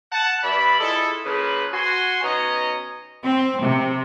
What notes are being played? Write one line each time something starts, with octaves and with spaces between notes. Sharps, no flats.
F#5 A5
G2 D5 E5 B5
G#3 E4 F4 A4
C#3 F3 A#3 B4
F#4 G#5 C6
B2 C#4 D#4 C#5 D#5 A#5
C4
C3